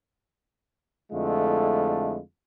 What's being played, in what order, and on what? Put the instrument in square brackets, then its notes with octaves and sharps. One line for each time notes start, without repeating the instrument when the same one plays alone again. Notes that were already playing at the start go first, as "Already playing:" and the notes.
[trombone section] F2 D3 G#3 A3 E4 F4